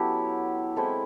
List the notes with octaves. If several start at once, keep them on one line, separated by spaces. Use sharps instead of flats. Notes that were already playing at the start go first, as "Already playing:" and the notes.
Already playing: F#3 B3 C#4 E4 G4 A4
G#3 C4 E4 A4